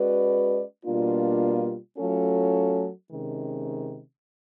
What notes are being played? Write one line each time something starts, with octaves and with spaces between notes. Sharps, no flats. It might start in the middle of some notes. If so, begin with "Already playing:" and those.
Already playing: G#3 C#4 F#4 B4 D5
B2 G3 A#3 D4 F4
F#3 A3 C#4 F4 A4
C3 D#3 G#3 C#4